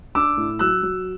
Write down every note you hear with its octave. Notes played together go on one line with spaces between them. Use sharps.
D4 D6 E6
A2
F#3 E6 F#6
F#3